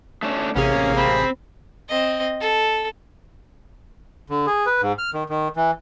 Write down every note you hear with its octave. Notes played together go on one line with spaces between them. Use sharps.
A3 C#4 D4
A1 C3 A#3 C#4 G#4
C4 B5
C4 D#5
A4
D3
G#4
B4
G#2
F6
D#3
D#3
E3